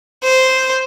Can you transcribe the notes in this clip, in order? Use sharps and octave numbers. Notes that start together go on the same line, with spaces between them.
C5